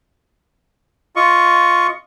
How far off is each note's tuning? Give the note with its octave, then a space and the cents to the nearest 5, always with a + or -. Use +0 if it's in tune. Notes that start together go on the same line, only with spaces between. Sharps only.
F4 +0 D#5 +0 C#6 +5